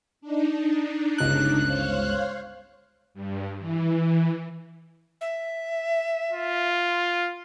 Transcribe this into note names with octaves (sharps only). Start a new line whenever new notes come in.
D4 D#4
G1 C#2 F#6
C5 C#5 F5
G2
E3
E5
F4